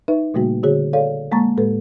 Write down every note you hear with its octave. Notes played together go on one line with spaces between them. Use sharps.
D#4 B4 E5
A#2 C#3 G3 A3 A#3 F#4
D3 F#4 G#4 C#5
A4 C#5 D5 F5
G#3 A#3 A5 A#5 C#6 A6
A2 G#3 A4 B4